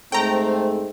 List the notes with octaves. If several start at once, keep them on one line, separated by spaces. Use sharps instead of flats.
G#2 A3 C4 G5 A#5